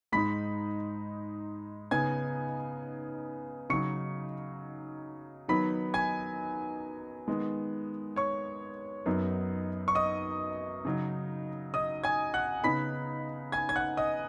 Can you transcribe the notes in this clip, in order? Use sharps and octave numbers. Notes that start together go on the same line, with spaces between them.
G#2 G#3 D#4 B5 B6
C#3 B3 D#4 G#5 G#6
C#3 F#3 D#4 C#6 C#7
D#3 F#3 B3 D#4 B5 B6
G#5 G#6
D#3 G#3 B3
C#5 C#6
F#2 F#3 B3 D#4
C#6
D#5 D#6
C#3 F#3 D#4
D#5 D#6
G#5 G#6
F#5 F#6
C#3 B3 D#4 B5 B6
G#5 G#6
G#6
F#5 F#6
D#5 D#6